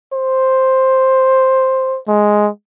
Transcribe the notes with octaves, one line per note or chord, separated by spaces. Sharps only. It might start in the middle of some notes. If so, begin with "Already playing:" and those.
C5
G#3